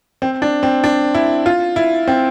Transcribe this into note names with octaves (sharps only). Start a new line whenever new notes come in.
C4
D4
C4
D4
E4
F4
E4
C4